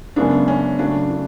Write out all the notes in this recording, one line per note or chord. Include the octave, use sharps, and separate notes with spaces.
F#2 C#3 G#3 B3 D4
C#4
C#3 F#3 A3 D4
D4